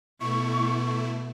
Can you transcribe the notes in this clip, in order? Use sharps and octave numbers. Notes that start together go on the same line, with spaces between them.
B2 A3 E4 C#6